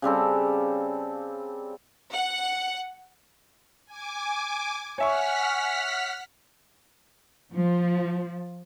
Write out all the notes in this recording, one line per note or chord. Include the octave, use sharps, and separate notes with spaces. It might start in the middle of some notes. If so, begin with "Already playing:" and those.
C#3 G3 C4 A4
F#5
G#5 D6
C#5 E5 F#5 G#5 C#6 F6 B6
F3